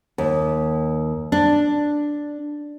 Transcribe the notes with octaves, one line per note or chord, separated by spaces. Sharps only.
D#2
D4